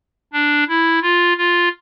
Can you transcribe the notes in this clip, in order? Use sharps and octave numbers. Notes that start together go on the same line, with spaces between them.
D4
E4
F4
F4